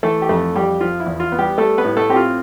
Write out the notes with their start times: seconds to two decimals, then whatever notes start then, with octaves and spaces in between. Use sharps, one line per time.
0.03 E3 A3 A4
0.22 G4
0.29 F2 A3 A4
0.55 F2 G3 G4
0.81 F3 F4
1.00 E4
1.06 E2
1.20 F4
1.32 B3
1.39 G3 G4
1.58 G3 A3 A4
1.78 B3 B4
1.84 A2
1.97 A3 A4
2.10 C4 G4
2.16 F4